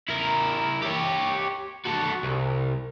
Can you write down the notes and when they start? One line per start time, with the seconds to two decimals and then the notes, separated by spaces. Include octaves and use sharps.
0.08 E4 A#4
0.82 G4 C#5
1.85 F#4 A4
2.23 C2